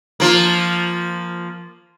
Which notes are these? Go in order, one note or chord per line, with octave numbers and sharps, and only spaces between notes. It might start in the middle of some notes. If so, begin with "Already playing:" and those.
F3 A#3